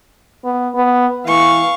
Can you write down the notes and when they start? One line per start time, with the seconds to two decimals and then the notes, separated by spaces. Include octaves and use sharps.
0.45 B3
0.75 B3
1.27 E3 F5 C#6